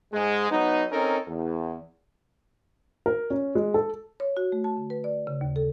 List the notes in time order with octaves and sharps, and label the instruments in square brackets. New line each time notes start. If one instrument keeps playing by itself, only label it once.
[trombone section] G#2 G#3
F#3 B3 D#4
C4 C#4 D#4 A4 A#4
E2
[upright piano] A#4
C#4
G#3
A4
[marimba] C#5
F#4
A3
A5
D3
B4
D5
C#3
D#2
A4